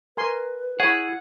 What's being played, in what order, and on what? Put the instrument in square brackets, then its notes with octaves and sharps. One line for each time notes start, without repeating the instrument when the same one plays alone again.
[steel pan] A#4 G#5 C6 [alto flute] B4
[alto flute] E4 [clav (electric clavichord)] G#4 [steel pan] C#5 B5 [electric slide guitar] F#5